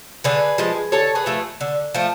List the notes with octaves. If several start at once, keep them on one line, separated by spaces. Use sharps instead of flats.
D3 G#4 B4
F3 G#3
D3 A4 C#5
G#4 B4
F3 A3
D3
F3 A3